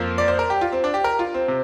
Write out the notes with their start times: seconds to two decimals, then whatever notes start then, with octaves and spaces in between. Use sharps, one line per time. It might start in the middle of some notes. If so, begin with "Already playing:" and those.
Already playing: F2 F3 A#3
0.18 D5
0.28 C5
0.39 A#4
0.50 G4
0.61 F4
0.72 C4
0.84 D4
0.94 G4
1.04 A#4
1.19 F4
1.34 C4
1.48 C3